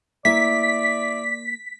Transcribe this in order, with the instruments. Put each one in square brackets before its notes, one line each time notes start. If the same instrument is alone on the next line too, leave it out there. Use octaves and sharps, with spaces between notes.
[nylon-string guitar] A#3 [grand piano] E4 [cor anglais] D5 [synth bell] B6